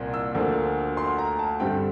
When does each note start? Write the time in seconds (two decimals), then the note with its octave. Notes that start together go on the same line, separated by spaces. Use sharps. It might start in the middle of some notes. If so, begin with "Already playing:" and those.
Already playing: C2 A#2 C4
0.14 E6
0.35 D2 D3 F3 A#3
0.97 C6
1.18 A#5
1.39 A5
1.60 G2 D3 G3 C4 G5